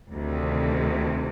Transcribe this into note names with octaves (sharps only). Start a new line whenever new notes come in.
D2 C3 D#3